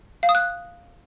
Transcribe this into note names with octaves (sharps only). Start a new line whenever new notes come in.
F5
D#6
F#6